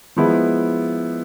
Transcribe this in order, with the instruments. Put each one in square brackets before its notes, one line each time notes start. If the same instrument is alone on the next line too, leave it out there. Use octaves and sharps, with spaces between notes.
[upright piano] F3 G#3 B3 E4